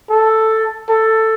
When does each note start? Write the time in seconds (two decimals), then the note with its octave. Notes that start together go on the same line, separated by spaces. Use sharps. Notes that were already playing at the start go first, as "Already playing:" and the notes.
0.10 A4
0.89 A4